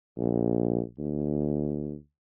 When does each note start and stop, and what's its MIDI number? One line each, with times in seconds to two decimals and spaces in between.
0.18 0.81 34
0.99 1.95 38